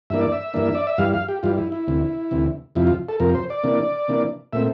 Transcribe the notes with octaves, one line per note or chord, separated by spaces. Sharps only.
G2 E3 A#3 D4 E5
D5
E5
G2 E3 A#3 D4
D5
E5
G2 E3 G3 F5
F5
G4
G2 E3 G3 F4
E4
E4
D2 C3 E3
D2 C3 E3
F2 C3 F3 E4
F4
A4
F2 C3 F3 A#4
C5
D5
C3 E3 A#3 D4
C3 E3 A#3 D4
A#2 A3 C4 E5